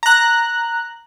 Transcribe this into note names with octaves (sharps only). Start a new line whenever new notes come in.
A#5 F#6